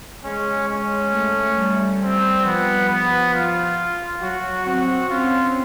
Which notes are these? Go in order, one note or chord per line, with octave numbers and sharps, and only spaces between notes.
G#3 C#4
C#4
A3
G3
G3 C4
F3 B3
F3 B3
F4
F#3 F#4
C4 F#4
C#4 F4